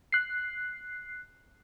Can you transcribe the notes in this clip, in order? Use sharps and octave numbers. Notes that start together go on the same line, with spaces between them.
F#6 C7